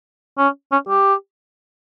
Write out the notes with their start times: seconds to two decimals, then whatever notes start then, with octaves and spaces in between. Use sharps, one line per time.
0.38 C#4
0.72 C#4
0.89 G4